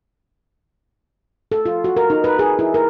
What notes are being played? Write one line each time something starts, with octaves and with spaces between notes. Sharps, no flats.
A4
F4
F#4
A#4
D#4
B4
G#4
E4
A#4